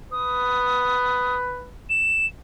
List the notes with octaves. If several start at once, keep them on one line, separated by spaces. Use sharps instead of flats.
B4 D#6
E7